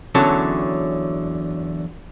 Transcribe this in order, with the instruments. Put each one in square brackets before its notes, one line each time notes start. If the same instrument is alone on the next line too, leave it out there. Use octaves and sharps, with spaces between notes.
[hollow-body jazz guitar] E2 D3 F#3 C#4 A4 A5